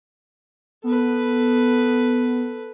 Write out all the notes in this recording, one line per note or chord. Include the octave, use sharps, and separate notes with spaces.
B3 A4 B4